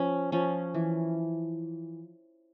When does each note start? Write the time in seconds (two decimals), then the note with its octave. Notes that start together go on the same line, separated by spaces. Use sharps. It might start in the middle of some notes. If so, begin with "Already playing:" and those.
Already playing: F3 C#4
0.32 F3 C#4
0.74 E3